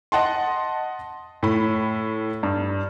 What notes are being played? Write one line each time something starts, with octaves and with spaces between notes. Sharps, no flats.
D#5 F#5 A5 C6
A2 B5
G2